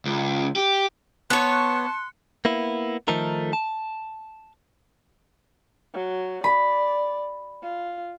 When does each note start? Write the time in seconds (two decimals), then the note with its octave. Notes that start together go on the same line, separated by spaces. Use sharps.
0.05 C#2
0.56 G4
1.30 B3 C#5 A5 C6 F#6 C#7
2.45 A#3 B3 E4
3.08 D#3 F3 A3 D#4 A4 A#4
3.53 A5
5.94 F#3
6.44 D5 B5
7.63 F4